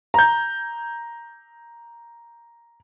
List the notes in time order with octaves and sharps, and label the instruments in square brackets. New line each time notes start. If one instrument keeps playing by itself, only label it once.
[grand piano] A#5 G6